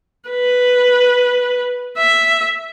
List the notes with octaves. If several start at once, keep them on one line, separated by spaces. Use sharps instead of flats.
B4
E5